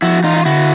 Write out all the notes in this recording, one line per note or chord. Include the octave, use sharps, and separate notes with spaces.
F3 E4 F#4
E3 D#4 F4
F4
D3 E4 F#4